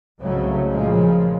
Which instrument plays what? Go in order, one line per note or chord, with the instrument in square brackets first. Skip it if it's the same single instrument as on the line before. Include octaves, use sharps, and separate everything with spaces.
[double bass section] C2 G#2 C#3 F#3 A3
A#2 C#3 F3 G#3